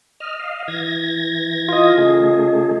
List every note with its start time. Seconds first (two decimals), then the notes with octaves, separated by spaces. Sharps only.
0.20 D#5 F6
0.39 D#5 F5
0.68 E3 G#6 A#6
1.69 F4 D#5
1.98 C#3 A3 G#4